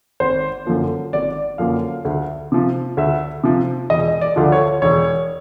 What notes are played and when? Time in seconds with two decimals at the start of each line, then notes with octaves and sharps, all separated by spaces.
0.20 G#1 C5
0.66 F#2 D3 F3 A#3
1.13 G#1 D5
1.58 F#2 D3 F3 A#3 F5
2.05 D2
2.52 C3 F3
2.97 D2 E5
3.44 C3 F3
3.90 E1 D#5
4.21 D5
4.36 D2 D3 F3
4.52 C#5
4.82 E1 C#5